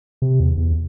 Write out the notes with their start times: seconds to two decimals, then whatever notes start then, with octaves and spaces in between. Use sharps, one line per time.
0.22 C3
0.40 E2
0.57 E2